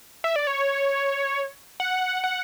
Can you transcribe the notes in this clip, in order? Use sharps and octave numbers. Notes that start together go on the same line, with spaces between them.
E5
D5
C#5
F#5
F#5